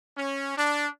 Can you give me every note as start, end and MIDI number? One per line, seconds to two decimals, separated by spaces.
0.17 0.54 61
0.57 0.89 62